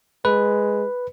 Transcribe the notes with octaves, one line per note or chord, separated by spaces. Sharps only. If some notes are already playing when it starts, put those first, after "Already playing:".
G#3 B4